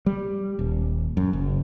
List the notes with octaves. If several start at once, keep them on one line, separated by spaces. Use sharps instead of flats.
G3
D#1
F#2
F#1